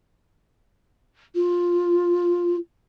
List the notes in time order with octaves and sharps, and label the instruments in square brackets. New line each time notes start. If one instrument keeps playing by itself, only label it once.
[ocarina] F4